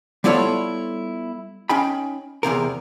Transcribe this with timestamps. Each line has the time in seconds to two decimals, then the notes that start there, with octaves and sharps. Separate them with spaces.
0.24 G3 B3 E4 F4 A4 C#5
1.69 C#4 D#4 G5 B5
2.43 E2 G2 C3 A#4